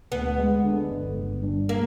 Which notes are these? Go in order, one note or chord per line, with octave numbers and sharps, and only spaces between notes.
D2 B3
G#3
D3
G1
G1
G2
A#3